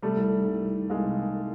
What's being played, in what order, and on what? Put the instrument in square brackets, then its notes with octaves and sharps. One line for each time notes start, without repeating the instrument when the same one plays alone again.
[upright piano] C3 G3 A3
C2
D#3
C2
C2
D#3
C2 G#3 A#3
C3
D#3